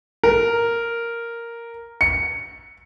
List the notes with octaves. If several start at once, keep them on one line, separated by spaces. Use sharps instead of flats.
A#4
C#7